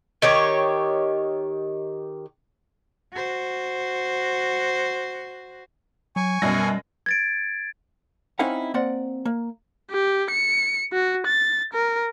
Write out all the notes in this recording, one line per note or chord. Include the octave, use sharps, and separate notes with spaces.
D#3 G4 C#5
F#4 C5
F#3 G#5 C#6
F#2 B2 G3 A#6
G#6 A6 D7
C4 C#4 D#4 E4 F5 F#5
A#3 C4 D5 F#5
A#3
G4
C#7
F#4
A6
A#4